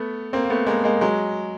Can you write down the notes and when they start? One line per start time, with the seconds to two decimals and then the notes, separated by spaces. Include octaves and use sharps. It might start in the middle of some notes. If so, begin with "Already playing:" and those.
Already playing: A3 B3
0.33 A#3 C4
0.44 A#3
0.50 A3 B3
0.67 G#3 A#3
0.84 G#3 A#3
1.01 F#3 G#3